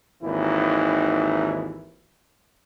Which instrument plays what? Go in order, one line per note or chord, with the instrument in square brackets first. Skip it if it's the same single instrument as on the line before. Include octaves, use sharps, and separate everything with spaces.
[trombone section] G#1 D#2 E3 E4